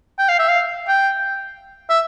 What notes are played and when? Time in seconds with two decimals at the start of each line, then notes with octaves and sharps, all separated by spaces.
0.19 G5
0.29 F5
0.39 E5
0.49 F5
0.88 G5
1.90 E5